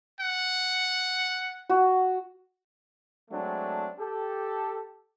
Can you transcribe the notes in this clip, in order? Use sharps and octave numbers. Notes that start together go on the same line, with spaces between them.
F#5
F#4
F#3 G#3 A3 C4 D4
G4 A4